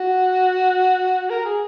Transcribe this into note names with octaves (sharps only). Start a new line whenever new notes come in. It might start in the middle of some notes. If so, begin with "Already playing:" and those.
Already playing: F#4
A#4
G#4